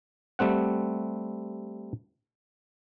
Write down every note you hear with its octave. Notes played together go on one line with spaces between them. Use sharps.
G3 A3 C4 F#5